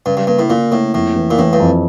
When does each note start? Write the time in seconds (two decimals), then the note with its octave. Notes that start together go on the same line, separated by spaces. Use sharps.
0.06 G2 C#3
0.17 G2
0.27 G2 A#3
0.39 A2
0.50 A#2 A#3
0.71 A2 A#3
0.94 F2 A2
1.16 E3
1.30 A#2
1.38 A2 E3
1.53 G2
1.60 F2